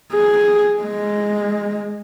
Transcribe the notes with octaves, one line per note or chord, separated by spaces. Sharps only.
G#4
G#3